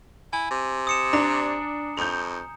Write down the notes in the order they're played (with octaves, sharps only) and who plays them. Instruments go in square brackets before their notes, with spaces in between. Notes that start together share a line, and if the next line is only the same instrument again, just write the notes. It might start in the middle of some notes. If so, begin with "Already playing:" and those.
[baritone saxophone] E4 [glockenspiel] G#5
[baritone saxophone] C3
[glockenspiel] D#6 C#7 E7
[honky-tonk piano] D4 [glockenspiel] A#5
[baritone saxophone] F2 [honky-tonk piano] G6 F7